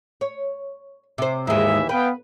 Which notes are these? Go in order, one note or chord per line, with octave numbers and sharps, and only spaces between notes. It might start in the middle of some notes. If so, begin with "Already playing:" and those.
C#5
C3 C5
D#2 G#2 E3 G#3 E5
B3 B4 F5 G5